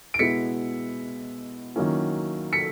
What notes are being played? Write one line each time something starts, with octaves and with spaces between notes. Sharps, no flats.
D7
B2 G#3 B3 E4 B6 C#7
D#3 F#3 A#3 C#4 E4
B6 C#7